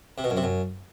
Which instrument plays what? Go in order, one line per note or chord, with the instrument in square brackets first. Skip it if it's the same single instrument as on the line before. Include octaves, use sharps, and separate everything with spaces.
[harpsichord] C3
B2
F#2
C3
F#2